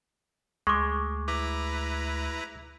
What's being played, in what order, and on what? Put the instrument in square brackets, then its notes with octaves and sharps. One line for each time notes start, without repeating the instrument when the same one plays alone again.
[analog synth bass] D2 [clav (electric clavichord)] G#3 [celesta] C#6 D6
[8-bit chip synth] E4 B4 A#5 [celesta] D6